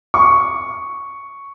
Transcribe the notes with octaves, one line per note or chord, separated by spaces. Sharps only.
C#6